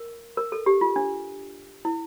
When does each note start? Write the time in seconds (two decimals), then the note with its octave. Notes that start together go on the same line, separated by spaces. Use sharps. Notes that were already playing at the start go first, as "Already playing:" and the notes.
Already playing: A#4
0.37 A#4
0.52 A4
0.66 G4
0.81 F4
0.96 D4
1.85 E4